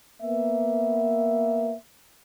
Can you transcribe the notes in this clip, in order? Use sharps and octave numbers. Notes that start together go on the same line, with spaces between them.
A#3 B3 E5